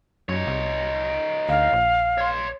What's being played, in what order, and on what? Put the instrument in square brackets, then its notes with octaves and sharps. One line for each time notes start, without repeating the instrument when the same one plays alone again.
[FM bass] F#2 [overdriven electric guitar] D#4 C#5
[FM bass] C2
[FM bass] D2 [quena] F5
[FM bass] A#1
[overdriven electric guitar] C#5 C6